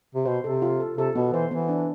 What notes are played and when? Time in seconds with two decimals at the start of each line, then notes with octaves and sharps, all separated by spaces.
0.15 C3
0.26 B2 C5
0.44 C3 A4
0.62 F4
0.80 A4
0.98 C3 A4
1.16 B2 B3
1.33 E3 C5
1.51 E3 B3
1.69 D4